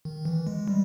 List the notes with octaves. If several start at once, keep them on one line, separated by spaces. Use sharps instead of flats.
D#3
E3
G#3
G3